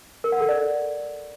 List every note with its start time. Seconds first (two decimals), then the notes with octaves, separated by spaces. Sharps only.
0.24 A#4
0.32 F#5
0.41 A4
0.49 D5